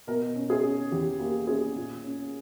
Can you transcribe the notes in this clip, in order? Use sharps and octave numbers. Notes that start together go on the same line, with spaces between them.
B2 A#4
C#4
G#4
C#4
E2 G4
A#3 G4
C#4 G#4
A#2
C#4